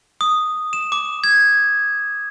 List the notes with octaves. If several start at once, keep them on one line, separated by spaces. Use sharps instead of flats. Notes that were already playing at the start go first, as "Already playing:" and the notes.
D#6
E7
D6
G#6